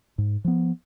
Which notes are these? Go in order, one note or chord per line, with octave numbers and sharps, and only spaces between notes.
G#2
F3 B3